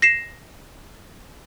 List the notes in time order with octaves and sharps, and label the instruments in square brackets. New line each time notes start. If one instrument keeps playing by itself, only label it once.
[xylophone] A#6 C7 E7